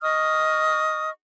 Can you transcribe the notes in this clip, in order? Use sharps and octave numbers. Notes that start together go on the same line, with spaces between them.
D#5 C#6 D#6 F6